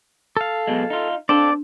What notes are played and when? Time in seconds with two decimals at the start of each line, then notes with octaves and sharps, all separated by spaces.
0.37 A4 F5
0.67 B1 B2 G#3
0.90 D#4 F4
1.29 C4 D4 A4 D5